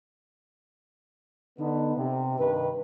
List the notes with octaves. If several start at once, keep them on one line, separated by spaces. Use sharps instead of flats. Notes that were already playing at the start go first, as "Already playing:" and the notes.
D3 B3 D#4
C3
G2 D#3 B4